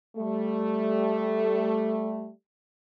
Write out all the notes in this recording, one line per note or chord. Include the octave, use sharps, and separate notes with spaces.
G3 A3